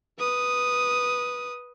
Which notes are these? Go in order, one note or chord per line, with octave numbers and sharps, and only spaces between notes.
B4 D#6